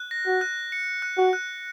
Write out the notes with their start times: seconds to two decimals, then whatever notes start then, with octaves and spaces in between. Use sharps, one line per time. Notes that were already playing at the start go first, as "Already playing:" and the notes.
Already playing: F#6
0.11 A#6
0.27 F#4
0.41 F#6
0.72 C#7
1.02 F#6
1.18 F#4
1.33 F#6